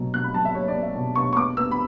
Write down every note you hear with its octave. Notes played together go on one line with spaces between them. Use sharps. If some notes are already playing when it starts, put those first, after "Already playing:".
Already playing: B2 F#3
B2 F#6
B5
F#3 A5
E5
F#3 C#5
D5
B3
E5
B2
B2 C#6
C#6
B3 D6
B3 E6
B5